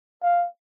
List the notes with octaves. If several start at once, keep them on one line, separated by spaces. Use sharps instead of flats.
F5